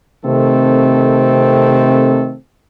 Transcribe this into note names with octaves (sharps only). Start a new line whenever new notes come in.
C3 D#3 A3 C4 A4